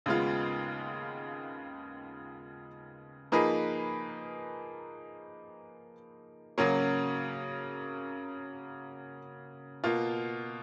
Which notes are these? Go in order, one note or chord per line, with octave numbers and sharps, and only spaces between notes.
D#2 C#3 G#3 B3 F4
F3 A#3 D#4 G#4 B4
C#3 F#3 A#3 C#4
B2 A#3 F4